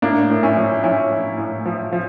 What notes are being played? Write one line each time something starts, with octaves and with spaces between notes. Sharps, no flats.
A2 A#3 D4
A2
C#4 E4
F3
F3 C#4 E4
A2
A2
F3
F3